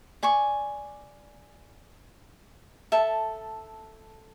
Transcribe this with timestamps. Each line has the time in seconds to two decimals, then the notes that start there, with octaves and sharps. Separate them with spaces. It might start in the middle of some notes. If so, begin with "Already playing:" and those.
0.23 D5 G#5 C#6
2.92 A4 E5 A5